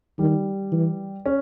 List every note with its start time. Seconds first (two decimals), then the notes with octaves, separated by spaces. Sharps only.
0.19 D#3 G3
0.72 E3
1.26 C#4